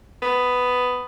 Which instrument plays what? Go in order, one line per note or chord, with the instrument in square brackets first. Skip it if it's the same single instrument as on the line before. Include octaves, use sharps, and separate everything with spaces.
[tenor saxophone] B3